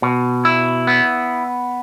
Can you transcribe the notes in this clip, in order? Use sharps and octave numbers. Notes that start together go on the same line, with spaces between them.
B2
E4
B3